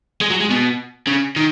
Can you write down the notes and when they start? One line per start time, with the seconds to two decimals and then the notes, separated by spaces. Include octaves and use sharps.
0.21 G#3
0.30 F#3
0.41 G#3
0.50 B2
1.07 C#3
1.37 D#3